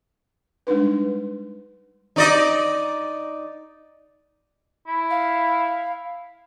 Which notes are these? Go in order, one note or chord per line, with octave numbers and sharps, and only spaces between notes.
G3 G#3 D4 D#4 B4
D#4 D5 D#5
E4
F5